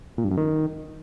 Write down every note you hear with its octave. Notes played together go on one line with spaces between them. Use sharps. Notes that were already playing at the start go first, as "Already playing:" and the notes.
A#2
G2
F#2
D#3